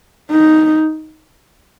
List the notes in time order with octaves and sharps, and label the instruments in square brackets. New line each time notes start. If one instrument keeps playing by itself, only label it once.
[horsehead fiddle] D#4